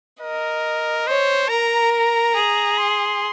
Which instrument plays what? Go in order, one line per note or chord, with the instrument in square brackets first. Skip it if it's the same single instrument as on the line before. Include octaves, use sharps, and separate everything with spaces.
[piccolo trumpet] A#4 [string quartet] D#5
[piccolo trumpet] C5 [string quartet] C#5
[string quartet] A#4 [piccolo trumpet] A#5
[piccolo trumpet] A#5
[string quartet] G#4
[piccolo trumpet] C6